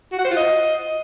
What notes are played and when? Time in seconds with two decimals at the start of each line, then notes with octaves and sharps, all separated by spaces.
0.12 F#4
0.18 F#5
0.25 C5
0.31 F4
0.37 D#5